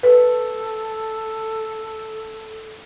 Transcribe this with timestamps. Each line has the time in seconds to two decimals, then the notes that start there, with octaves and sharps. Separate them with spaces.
0.03 A4 B4